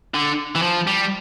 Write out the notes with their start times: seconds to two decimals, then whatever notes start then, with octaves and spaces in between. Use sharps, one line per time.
0.14 D3
0.55 E3
0.62 F3
0.87 G3